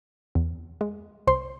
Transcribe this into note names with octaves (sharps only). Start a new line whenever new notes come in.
E2
G#3
C2 C5 C6